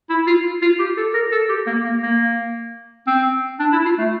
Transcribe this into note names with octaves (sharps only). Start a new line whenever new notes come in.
E4
F4
F4
G4
A4
A#4
A4
G4
A#3
A#3
A#3
C4
D4
E4
F4
A3